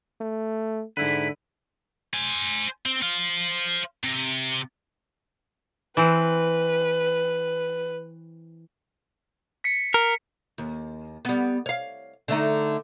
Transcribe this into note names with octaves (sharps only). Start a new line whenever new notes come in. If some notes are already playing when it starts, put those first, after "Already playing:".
A3
G#2 D3 E4 B4
C5 G#5
C4
C5 F5
C3
E3 C4 B4
B6 C#7
A#4
D#2
G3 B3
C#5 F5
D3 A3 D#4